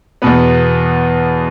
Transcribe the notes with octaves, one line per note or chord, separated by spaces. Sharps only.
E2 B2 B3 B4